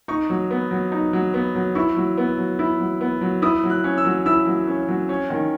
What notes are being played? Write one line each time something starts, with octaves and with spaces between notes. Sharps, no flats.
D#4 C#6
F#3
B3
F#3
D#4
F#3
B3
F#3
E4 C#6
F#3
B3
F#3
E4
F#3
B3
F#3
E4 D#6
F#3
F#6
C#4
E6
F#3
E4 E6
F#3
C#4
F#3
C#4
D#3